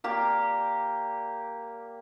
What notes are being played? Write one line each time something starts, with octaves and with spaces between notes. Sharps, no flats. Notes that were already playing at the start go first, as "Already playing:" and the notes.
A#3 G4 D5